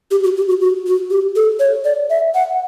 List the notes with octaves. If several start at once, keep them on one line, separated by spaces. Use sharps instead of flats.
G4
F#4
G4
F#4
F#4
F#4
G4
A4
C#5
D5
E5
F#5